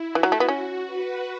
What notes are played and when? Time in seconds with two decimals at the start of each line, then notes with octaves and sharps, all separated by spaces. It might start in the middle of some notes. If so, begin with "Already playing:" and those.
Already playing: E4
0.10 F#4
0.15 E3
0.23 F#3
0.32 A3
0.40 B3
0.49 C#4
0.86 B4